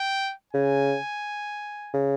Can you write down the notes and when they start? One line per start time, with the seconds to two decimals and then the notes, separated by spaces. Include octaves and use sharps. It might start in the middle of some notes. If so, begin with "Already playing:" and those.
Already playing: G5
0.53 C#3 G#5
1.94 C#3